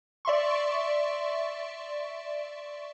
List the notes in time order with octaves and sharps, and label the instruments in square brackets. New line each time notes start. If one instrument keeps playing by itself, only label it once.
[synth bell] D5 E5 C6 C#6